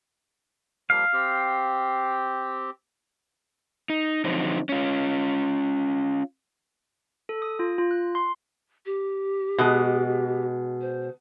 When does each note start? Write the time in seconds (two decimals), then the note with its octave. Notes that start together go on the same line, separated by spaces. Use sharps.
0.90 F3 G3 A#3 F5
1.13 C4 G4
3.90 D#4
4.25 D3 F3 F#3 C4 D#4
4.69 C#4 F4
7.29 A4
7.42 D#6
7.59 F4
7.78 F4
7.91 F#6
8.15 C6
8.86 G4
9.58 B2 G#3
10.81 C5